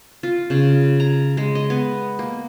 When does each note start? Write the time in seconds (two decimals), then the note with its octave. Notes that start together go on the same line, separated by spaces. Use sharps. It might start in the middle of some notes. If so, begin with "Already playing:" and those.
0.23 F4
0.50 C#3
1.00 A#5
1.37 G#3
1.55 D#5
1.70 B3
2.19 A#3